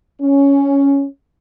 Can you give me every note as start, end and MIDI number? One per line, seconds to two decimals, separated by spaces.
0.21 1.05 61